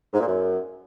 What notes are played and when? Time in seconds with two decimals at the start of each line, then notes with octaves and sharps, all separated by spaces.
0.13 G#2
0.20 A#2
0.27 F#2